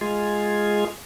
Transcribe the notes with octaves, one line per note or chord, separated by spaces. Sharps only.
G#3 F4 G#4